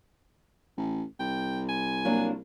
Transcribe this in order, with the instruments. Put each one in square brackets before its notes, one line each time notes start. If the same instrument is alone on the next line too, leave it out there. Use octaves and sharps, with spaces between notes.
[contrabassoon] A1
[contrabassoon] C2 [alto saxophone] G5
[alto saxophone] G#5
[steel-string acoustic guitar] F#3 A#3 D4